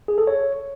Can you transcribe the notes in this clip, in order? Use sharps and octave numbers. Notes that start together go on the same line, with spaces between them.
G#4
A4
C#5